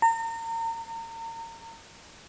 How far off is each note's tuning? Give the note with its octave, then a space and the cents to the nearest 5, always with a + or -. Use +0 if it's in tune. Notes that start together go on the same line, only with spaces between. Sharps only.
A#5 -35